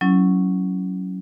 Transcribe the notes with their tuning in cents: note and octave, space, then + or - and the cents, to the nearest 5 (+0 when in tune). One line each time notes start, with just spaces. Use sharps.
F#3 +5 C#4 +0 E4 +0